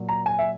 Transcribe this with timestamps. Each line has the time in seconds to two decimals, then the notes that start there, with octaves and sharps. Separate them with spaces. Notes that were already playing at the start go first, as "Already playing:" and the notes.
Already playing: A#2 F#3
0.09 A#5
0.26 G#5
0.39 E5